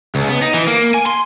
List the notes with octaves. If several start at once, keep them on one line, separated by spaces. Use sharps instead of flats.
C#2
B3
D#4
E3
A#3
G#5
C6